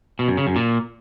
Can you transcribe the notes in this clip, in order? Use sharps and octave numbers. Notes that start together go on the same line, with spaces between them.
B2
F#2
C#3
F#2
A#2